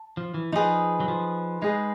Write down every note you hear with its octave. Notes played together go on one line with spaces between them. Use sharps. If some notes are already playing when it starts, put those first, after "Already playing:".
Already playing: A5
F3
E3
F3 D#4 G#4 B4
F#3
F3
G#3 D#4 G#4 B4